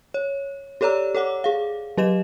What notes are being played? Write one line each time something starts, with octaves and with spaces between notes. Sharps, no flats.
C#5
G4 A4 C#5 D5 A#5 E6
A4 C#5 F#5 D6
G#4 F5
F#3 G4 D#5 E7